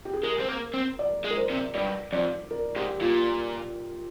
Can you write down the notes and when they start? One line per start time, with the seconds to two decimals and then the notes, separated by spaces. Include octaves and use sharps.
0.05 G4
0.13 G#4
0.23 G#3 A#4
0.40 C4
0.49 A#3
0.74 C4
0.99 D5
1.25 G#3
1.31 A#4
1.37 C5
1.50 C3
1.75 G2 D5
2.13 F2 D5
2.51 A#4
2.76 G#2 G4
3.01 A#2 F4